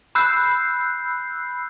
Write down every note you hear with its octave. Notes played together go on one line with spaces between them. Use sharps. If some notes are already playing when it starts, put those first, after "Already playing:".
B5 E6 F#6 G6 C7